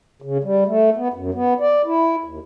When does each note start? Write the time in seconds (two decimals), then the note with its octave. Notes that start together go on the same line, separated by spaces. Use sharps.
0.22 C#3
0.44 G3
0.67 A3
0.97 B3
1.14 F#2
1.34 B3
1.60 D5
1.85 E4
2.24 D#2